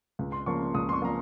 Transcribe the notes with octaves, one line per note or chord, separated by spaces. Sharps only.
C#2
C6
C#3 F3 A#3 C#6
C#2 D#6
C6
C#6
C#3 F3 A#3 A#5